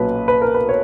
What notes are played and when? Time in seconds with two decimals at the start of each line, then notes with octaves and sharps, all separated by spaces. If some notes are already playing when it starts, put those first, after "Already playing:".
Already playing: B1 A#2 F#3 C#4 B4
0.28 B4
0.42 A#4
0.55 B4
0.69 C#5